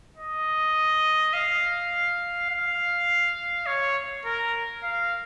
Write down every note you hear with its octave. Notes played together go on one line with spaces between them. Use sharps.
D#5
F5
F5
C#5
A#4
F5